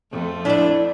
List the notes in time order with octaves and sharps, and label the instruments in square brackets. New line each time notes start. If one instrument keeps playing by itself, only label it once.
[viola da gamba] F2 A3
[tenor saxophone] D4 [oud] E4 D5